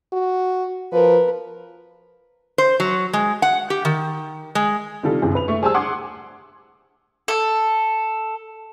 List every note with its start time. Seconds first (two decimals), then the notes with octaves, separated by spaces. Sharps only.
0.12 F#4
0.92 F3 A#4 B4
2.58 C5
2.80 F#3
3.13 G#3
3.42 F#5
3.70 G4
3.85 D#3
4.55 G#3
5.03 C3 D#3 G3 F4 A4
5.22 G1 F#2 C3 E3 G#4
5.35 B4 F7
5.48 A3 C#6
5.62 G3 G#4 C5 G#5 A5 E6
5.74 F#5 C6 D6 D#6 G#6
7.28 A4